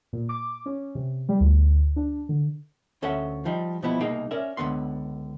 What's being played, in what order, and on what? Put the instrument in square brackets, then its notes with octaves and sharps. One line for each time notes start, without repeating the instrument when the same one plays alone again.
[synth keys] A#2
D6
C#4
C3
G3
D2
D4
D3
[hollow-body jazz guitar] D2 C#4 A4 E5 F#5
F3 G3 D#4
B2 F3 G3 B3 E4
C2 B2 A#3 D#4 G#4 G5
C#4 A#4 D5 E5
C#2 G#2 D3 B3 C6